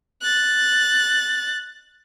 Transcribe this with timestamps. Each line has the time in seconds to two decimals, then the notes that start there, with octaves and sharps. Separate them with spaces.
0.22 F#6 A6